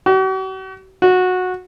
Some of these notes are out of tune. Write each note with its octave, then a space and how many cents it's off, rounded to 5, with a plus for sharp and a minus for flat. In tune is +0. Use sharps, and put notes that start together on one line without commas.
F#4 +45
F#4 -15